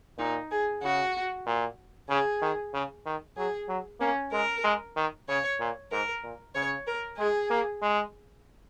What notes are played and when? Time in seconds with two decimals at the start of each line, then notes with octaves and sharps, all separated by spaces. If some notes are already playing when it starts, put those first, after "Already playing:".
0.18 A#2 D#4
0.51 G#4
0.83 C#3 F#4
1.46 A#2
2.09 C#3 G#4
2.41 D#3
2.73 C#3
3.06 D#3
3.37 F#3 G#4
3.68 F#3
4.00 A#3 C#4
4.32 G#3 A#4
4.64 G#3
4.96 D#3
5.28 C#3 C#5
5.60 A#2
5.91 G#2 A#4
6.23 A#2
6.55 C#3 C#5
6.87 A#4
7.18 G#3 G#4
7.50 A#3
7.82 G#3